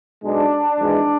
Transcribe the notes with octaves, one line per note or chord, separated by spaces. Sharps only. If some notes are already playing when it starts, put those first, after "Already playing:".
B1 B2 G#3 D4
G#1 G#2 E3 G#3